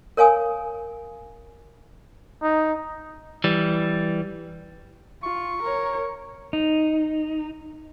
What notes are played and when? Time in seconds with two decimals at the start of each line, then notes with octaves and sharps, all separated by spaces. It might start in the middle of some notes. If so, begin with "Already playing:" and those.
0.17 A#4 C#5 F5 G#5 D#6
2.42 D#4
3.44 E3 G3
5.23 F4 C#6
5.63 A#4 C#5
6.53 D#4